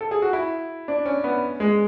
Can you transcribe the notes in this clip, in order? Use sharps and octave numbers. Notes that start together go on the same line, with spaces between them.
A4
G#4
F#4
E4
D4
C#4
B3
G#3